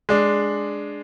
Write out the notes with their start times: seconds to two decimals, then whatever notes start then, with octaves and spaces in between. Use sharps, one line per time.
0.09 G#3 D4